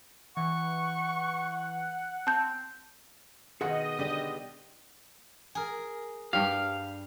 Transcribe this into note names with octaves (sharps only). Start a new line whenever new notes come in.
E3 F#5 C#6
C4 A5 G6
B2 D#3 G#4 D#5 F#5
D3 G3 D4 G4
G#4 A#4
G2 G3 G4 F5